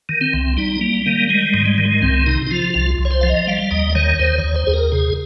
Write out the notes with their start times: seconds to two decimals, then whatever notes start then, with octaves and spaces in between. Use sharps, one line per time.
0.09 D#3
0.21 C4
0.33 C2
0.57 G3 D#4
0.81 G3 A#3
1.06 D#3 A#3
1.29 G3 G#3
1.54 G#2
1.65 G#3
1.78 D#3
1.85 G#3
2.02 C2 C4
2.26 C3 D#4
2.47 D#4
2.51 F3 F4
2.74 C2 F4
2.99 C2
3.05 C#5
3.11 C5
3.21 F3 F5
3.29 D#5
3.47 G3 F5
3.71 D#2 D#5
3.95 D#3 C#5
4.19 D#2 C5
4.38 C#5
4.44 D#2
4.56 C5
4.67 D#2 G#4
4.74 A#4
4.92 C3 G#4